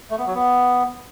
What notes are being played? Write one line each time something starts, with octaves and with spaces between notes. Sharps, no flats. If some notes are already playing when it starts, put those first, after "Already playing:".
A3
B3
F#3
B3